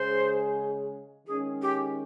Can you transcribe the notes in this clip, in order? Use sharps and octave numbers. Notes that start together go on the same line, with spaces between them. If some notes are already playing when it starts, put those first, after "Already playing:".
Already playing: C#3 G#3 C#4 G#4 C5
D#3 G#3 C#4 G#4
G4